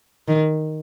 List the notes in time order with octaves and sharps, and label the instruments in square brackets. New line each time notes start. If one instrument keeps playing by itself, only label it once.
[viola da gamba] D#3